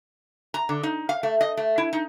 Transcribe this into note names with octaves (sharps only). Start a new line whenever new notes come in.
A#5
D3
D#4
F5
A3
D#5
A3
E4
D#4